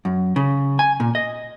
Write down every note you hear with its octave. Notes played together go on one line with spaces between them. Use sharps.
F#2
C#3
G#5
A#2
D#5